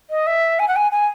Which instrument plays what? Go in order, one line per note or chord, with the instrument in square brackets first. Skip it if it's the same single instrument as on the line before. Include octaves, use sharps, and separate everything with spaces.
[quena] D#5
E5
G#5
F#5
G#5
G#5